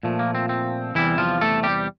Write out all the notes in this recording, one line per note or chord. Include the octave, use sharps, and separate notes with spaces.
A#2 F3 A3
A#3
C4
C4
E2 C3 E3 G3 E4
F3 F4
A3 A4
G3 G4